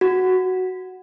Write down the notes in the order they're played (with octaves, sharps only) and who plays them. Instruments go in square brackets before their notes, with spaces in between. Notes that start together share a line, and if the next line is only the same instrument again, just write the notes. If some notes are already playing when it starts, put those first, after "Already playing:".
[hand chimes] F#4